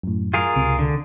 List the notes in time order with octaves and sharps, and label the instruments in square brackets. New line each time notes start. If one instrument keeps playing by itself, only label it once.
[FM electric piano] F#2 A2
[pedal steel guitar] F4 G#4 A#4
[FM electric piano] C#2 C3
[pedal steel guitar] D3